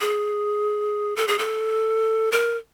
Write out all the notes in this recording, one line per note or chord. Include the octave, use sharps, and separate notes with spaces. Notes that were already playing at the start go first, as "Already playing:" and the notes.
G#4
A4
G#4
A4
A#4